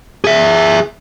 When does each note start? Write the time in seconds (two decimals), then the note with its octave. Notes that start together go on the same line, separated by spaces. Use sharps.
0.24 G#4 E5